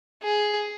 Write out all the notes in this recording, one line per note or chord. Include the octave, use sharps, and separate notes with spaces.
G#4